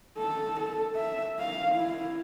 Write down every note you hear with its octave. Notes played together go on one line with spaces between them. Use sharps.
A4
A4
E5
F5
E4